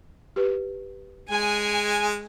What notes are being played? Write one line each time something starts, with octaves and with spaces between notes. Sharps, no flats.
G4 B4
G#3 G#5